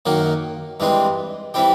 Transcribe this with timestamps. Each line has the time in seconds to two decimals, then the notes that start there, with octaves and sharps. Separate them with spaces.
0.06 F#2 D#3 F#3 A#3
0.80 G2 E3 G#3 C4
1.54 E3 G3 C4 E4 G4